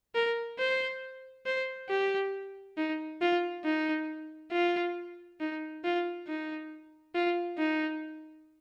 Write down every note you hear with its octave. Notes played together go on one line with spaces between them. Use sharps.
A#4
C5
C5
G4
D#4
F4
D#4
F4
D#4
F4
D#4
F4
D#4